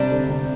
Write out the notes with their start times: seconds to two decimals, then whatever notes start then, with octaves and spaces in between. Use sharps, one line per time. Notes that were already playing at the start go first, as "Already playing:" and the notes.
Already playing: C3 G3 D4 G4 D5
0.11 D3
0.29 C3